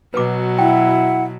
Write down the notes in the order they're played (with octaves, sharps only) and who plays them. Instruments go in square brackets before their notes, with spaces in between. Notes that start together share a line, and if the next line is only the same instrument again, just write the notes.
[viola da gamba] B2 F#3 [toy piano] B4 D6
[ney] E4 [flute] F#5 [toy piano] G5